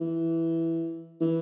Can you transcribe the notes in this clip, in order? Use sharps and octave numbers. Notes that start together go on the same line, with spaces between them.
E3
E3